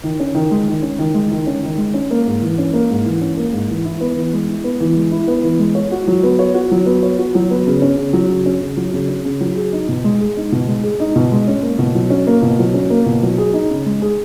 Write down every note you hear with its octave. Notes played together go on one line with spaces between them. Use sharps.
D#3
C#4
D#3
G#3
D#3
C#4
D#3
G#3
D#3
C#4
D#3
G#3
C#4
A#3
G#2
E3
C#4
A#3
G#2
E3
C#4
A#3
G#2
E3
E4
B3
E3
G#3
E4
B3
E3
G#3
E4
B3
E3
G#3
C#5
F#4
F#3
B3
C#5
F#4
F#3
B3
C#5
F#4
F#3
B3
C#3
C#4
C#3
F#3
C#3
C#4
C#3
F#3
C#3
C#4
C#3
F#3
G#4
D#4
B2
G#3
G#4
D#4
B2
G#3
G#4
D#4
B2
G#3
C#4
A#3
B2
F#3
C#4
A#3
B2
F#3
C#4
A#3
B2
F#3
G#4
D#4
C#3
G#3
G#4